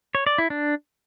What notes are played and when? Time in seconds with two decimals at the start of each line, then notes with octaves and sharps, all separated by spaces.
0.15 C#5
0.27 D5
0.38 E4
0.50 D4